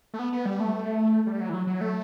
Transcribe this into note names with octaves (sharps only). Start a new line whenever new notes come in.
A3
B3
B3
G3
A3
G3
F#3
E3
F#3
F#3
A3